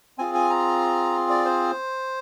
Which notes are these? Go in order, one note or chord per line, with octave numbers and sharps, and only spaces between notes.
C4 F4 G#4 G#5
G#5
A#5
D5
C5